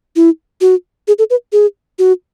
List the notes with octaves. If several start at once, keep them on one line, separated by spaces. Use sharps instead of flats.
E4
F#4
G#4
A4
B4
G#4
F#4